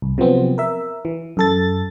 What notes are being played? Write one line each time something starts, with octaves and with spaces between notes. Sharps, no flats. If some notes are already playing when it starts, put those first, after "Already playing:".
C2
C3 F3 F#3 B3 C4
A#4 E5
E3
F#2 A4 A6